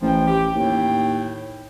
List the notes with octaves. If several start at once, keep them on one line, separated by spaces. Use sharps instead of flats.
A1 F3 G5
G4
D#2 A2